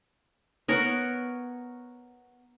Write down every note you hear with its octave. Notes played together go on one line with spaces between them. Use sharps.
B3 A#4 C#5